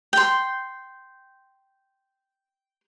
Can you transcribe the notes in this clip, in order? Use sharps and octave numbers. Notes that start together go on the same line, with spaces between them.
G5 C6